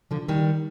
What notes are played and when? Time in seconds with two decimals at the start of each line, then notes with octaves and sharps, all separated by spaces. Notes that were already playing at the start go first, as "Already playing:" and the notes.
0.11 D3 F3
0.28 D#3 G3